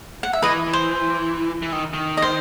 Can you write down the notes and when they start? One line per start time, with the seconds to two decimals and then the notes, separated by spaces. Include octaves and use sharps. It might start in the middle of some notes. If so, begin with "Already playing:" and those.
0.23 F#5
0.33 E5
0.42 E3 B4 D#5
0.73 C5
1.62 E3
1.72 D#3
1.94 D#3
2.17 D#5
2.22 C5